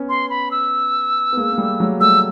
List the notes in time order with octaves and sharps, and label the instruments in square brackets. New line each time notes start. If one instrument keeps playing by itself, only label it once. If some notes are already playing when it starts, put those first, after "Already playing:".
Already playing: [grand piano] B3 C#4
[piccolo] C6
B5
E6
[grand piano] B3
G#3 A#3
A#3
G3 A3
F#3 G#3
[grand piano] G3 A3 [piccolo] E6